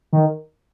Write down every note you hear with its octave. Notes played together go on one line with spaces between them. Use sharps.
D#3